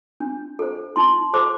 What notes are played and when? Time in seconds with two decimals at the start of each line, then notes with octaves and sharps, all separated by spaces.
0.20 D4
0.59 A4 C5
0.96 D#4 C6
1.33 A4 C5 D6